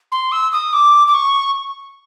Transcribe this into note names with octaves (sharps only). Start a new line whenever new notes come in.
C6
E6
D#6
D6
D6
C#6